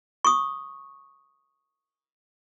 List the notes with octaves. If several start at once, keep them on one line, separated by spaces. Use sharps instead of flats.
C#6 D#6